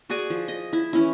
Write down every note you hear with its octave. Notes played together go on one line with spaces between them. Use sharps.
F#4 G#4 D5 G#5
F3
D#5
E4
E3 C#4 E4